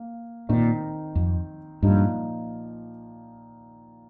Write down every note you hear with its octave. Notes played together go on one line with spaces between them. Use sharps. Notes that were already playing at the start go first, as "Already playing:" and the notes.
Already playing: A#3
A#2 D#3 C4 D#4
F2
G2 A#2 F3 D#4